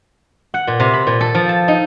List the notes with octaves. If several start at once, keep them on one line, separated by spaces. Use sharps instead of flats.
F#5
A#2
C3
B5
A#2
A4
F3
A5
D#4